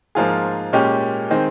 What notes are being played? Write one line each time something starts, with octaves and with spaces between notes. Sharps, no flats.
G#2 F3 A#3 F4 G#4
A#2 G#3 C#4 G4
D#3 G#3 C4